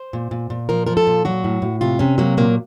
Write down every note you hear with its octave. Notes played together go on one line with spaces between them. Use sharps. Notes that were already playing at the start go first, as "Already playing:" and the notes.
Already playing: C5
A#2
A#2
A#2
F3 A#4
F3 A#4
A4
A#2
F#3 F#4
A2
A2
C3 F4
C3 C#4
F#3 A#3
A#2 A#3